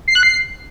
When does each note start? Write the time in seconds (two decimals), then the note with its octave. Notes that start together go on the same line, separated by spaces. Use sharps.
0.08 C7
0.15 F#6
0.23 C7